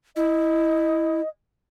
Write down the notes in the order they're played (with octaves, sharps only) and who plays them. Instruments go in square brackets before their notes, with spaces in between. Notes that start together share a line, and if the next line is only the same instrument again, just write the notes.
[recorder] E4 [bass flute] D#5